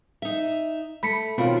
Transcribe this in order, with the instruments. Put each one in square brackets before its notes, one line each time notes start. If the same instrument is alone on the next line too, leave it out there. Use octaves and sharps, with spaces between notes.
[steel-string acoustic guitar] D#4 E5
[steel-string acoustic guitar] A3 [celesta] B5 B6 C#7
[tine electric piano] B2 C4 B5 [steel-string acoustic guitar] D#3 A#4 [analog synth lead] F4 [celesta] F#4 C#5